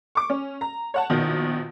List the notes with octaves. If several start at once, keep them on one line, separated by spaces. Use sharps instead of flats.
C#6 D6
C#4
A#5
C#5 F#5 A5
A#1 B2 D#3